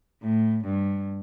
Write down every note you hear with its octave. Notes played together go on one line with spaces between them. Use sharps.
A2
G2